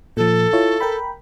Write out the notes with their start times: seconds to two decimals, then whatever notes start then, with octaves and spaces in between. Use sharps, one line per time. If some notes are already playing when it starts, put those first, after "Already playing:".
0.17 A#2 F3 A4
0.53 E4 F4 C#5
0.80 A#4 G5 B5